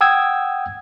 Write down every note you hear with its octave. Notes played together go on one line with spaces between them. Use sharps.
F#5 G5 D#6 E6 G#6